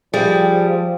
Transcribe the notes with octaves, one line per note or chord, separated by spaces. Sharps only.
F3 G3 G#4 G5